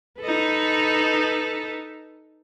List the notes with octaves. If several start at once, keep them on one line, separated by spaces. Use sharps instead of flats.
D#4 A4 B4